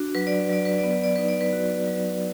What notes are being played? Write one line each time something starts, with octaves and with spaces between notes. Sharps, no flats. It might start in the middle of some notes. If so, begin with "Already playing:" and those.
Already playing: D4 F#4
F#3 B4
D5
B4
F#3 D5
B4
D5
B3
B4
D5
D#4 B4
D5
B4
F#4
F#3